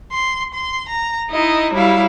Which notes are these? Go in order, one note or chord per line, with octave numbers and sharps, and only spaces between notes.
C6
C6
A#5
D#4 E4 D#5
F#3 G3 E4 F5